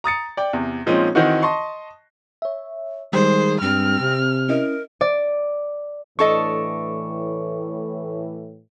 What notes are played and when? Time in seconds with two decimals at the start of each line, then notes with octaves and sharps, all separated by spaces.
0.04 A#5 D#6 A6 C#7
0.37 D5 G5
0.53 E2 C3
0.86 A#2 F3 G#3 C4 C#4 D#4
1.15 D#3 E3 C4 D#4 F#4
1.42 D#5 A5 C6 C#6
2.42 C#5 E5
3.13 D#3 G3 G#3 G#4 C5
3.62 G2 C4 F6
4.00 C3
4.49 C#4 E4 A#4 D#5
5.01 D5
6.19 A2 E3 D4 A4 D#5 C#6